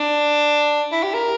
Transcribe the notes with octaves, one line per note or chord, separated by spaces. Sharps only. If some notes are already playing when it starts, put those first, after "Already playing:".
Already playing: D4
E4
G4
A#4